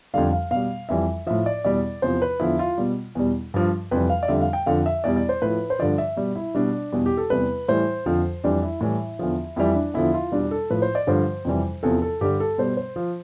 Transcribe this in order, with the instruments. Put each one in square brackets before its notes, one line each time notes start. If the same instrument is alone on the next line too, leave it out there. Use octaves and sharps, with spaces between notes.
[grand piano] F2 D3 G3 F5
F5
B2 G3 F5
F2 E3 G3 E5
A2 F3 E5
D5
E2 B2 G3 D5
E2 C3 F3 C5
B4
E2 D3 F3 E4
F4
B2 G3
E2 B2 G3
G2 F3
F2 C3 E3 G3 B4
F5
D5
F2 D3 G3 E5
F5
G5
F2 D3 F3 F5
E5
E2 B2 G3 D5
D5
C5
A2 F3 B4
C5
G2 D3 F3 D5
E5
B2 G3
E4
B2 G3 D4
E2 B2 G3
G4
A4
E2 C3 G3 B4
A2 E3 G3 C5
F2 D3 F3
F2 E3 G3 D4
E4
A2 E3 G3
E2 D3 F3
F2 E3 G3 E4
D4
E2 D3 F3 E4
F4
E2 B2 G3 D4
A4
A2 F3 B4
C5
D5
G2 D3 F3 C5
F2 C3 E3 G3
E2 C3 F3 A4
A4
G2 D3 G3 G4
A4
B2 G3 C5
C5
F3